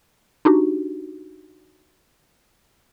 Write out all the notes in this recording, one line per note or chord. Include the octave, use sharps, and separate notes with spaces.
D4 D#4 F#4 G4